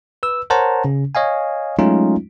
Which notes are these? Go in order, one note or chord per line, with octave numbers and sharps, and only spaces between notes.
B4 E6
A#4 C5 C#5 F#5 A5 A#5
C#3 C#4
C#5 D#5 F5 G#5
F#3 G#3 A3 C#4 D#4 F4